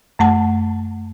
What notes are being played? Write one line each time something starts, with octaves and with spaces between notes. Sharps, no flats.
F#2 A3 F#5 A5